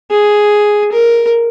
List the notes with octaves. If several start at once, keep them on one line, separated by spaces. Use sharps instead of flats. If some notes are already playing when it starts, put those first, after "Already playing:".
G#4
A#4